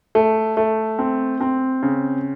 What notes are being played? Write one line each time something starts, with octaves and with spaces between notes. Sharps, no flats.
A3
A3
C4
C4
C#3